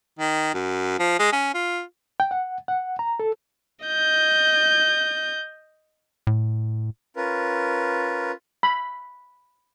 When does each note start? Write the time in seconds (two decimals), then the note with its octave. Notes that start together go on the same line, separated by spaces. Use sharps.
0.19 D#3
0.54 F#2
0.99 F3
1.19 G#3
1.32 C#4
1.54 F4
2.20 G5
2.31 F#5
2.68 F#5
2.99 A#5
3.20 A4
3.86 D#5 G6
6.27 A2
7.16 C#4 F4 A#4 B4
8.63 B5